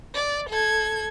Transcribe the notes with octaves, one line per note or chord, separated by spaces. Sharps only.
D5
A4 G#6